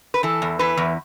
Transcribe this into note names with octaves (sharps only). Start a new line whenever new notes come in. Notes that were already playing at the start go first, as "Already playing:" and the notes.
B4
E3 A4
E2
E3 B4
E2